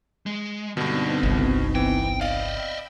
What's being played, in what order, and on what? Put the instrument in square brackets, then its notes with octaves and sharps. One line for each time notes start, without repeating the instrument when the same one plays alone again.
[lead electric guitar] G#3
[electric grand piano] G2 B2 [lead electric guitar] D3 [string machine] B3 C4 D#4
[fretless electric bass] G1 C2
[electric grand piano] E3 [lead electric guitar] G5
[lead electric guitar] D5 D#5 [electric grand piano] F5 [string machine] G5 B5 E6